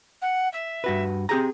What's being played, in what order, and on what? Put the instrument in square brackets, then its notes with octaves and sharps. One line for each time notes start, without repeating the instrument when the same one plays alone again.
[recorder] F#5
E5
[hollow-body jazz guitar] G2 F#4 B4
[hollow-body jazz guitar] C4 G4 A#5 [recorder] G#4